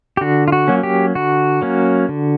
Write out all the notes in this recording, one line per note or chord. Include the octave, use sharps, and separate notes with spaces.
G4
D3 F#4
F4
F#4
F#3 A#3 C#4
G4
D3 F#4
F#3 A#3 C#4
D3